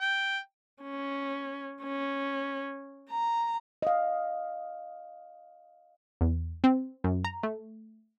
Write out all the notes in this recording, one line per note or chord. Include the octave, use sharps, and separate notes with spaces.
G5
C#4
C#4
A#5
D#5 F5
E2
C4
F#2
A#5
A3